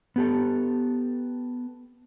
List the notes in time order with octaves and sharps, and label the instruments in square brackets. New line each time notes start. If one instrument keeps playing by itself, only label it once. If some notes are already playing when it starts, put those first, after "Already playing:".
[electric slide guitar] B3 G4 A4